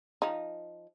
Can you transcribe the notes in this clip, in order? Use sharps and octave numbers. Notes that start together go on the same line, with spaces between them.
F3 D#4